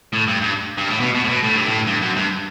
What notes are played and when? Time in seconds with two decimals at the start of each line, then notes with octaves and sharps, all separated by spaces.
0.13 A2
0.28 G2
0.42 G2
0.78 G2
0.89 A2
1.00 B2
1.15 B2
1.24 A2
1.29 B2
1.43 A2
1.56 G2
1.67 A2
1.87 G2
2.02 F#2
2.16 G2